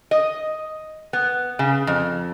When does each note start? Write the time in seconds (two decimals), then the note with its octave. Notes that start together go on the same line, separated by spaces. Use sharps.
0.11 D#5
1.13 B3
1.59 C#3
1.87 F2